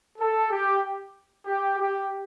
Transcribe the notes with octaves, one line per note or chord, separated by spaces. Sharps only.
A4
G4
G4
G4